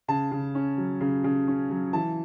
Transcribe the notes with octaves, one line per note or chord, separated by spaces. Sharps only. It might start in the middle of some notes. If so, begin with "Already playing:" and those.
C#3 A5
C#3
C#4
F#3
C#3
C#3
C#4
F#3
E3 A5